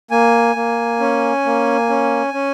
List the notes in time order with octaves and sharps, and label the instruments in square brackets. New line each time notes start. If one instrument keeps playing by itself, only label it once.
[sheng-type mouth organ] A#3 G#5
A#3
C#4
A#3
C#4
C#4